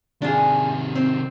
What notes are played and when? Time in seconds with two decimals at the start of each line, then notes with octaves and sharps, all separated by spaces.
0.22 C3 D#3 D4 F4 G#4
0.95 C4